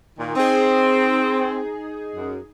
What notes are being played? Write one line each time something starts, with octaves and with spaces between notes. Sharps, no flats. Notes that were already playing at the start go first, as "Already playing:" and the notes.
A#2 D#3
C4 D#4 G#4
F#2